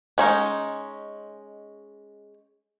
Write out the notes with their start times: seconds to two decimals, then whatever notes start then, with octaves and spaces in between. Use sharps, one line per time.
0.18 G#3 C#4 D#4